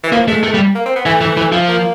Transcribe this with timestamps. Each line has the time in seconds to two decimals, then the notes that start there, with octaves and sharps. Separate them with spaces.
0.04 E3
0.12 F3 A#3
0.28 G#3 A3
0.44 A3
0.54 G3
0.75 A#3
0.86 C4
0.96 B3
1.06 E3 A3
1.21 E3
1.37 E3
1.52 F3
1.68 A#3